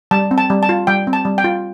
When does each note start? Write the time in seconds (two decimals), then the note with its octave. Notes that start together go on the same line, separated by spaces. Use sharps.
0.11 G3 A5
0.31 C4
0.38 A5
0.50 G3
0.63 A5
0.69 F4
0.87 G3 G5
1.07 C4
1.13 A5
1.25 G3
1.38 G5
1.44 F4